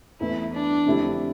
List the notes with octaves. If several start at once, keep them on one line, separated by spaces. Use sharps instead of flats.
E2 E3 A3 E4
D4
F2 D3 A3 E4 G4